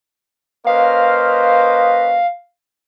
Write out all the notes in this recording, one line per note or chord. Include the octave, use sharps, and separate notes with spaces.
A#3 C#4 B4 C5 D#5 F5